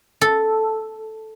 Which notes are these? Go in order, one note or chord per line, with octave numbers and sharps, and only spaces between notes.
A4